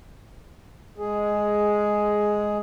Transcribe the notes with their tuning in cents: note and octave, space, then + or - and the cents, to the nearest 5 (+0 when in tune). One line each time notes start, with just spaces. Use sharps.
G#3 +0 G#4 +10